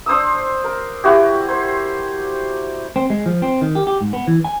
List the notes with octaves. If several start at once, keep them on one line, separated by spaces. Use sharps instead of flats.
D4 C5 D#6 E6
A#4
E4 F#4 G4
C5
C4
G#3
F3
C4
D#3
G4
G4
G#2
B3
E3
G#5